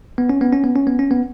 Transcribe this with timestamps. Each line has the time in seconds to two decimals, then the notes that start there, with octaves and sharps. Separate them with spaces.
0.18 B3
0.29 C#4
0.41 B3
0.52 C#4
0.64 B3
0.76 C#4
0.87 B3
0.99 C#4
1.11 B3